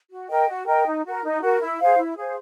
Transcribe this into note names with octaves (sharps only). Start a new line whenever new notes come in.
F#4
A#4 D#5 G5
F#4
A#4 D#5 G5
D#4
F#4 A#4
D#4
F#4 A#4
E4
G#4 C5 F5
E4
G#4 C5 F5